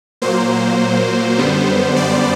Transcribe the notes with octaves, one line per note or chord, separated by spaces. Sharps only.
A#2 F#3 A#3 C5
F#2 D3 G3 B3
D5